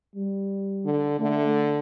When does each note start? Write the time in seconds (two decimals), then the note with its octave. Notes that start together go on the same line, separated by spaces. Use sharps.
0.16 G3
0.85 D3
1.20 D3 A3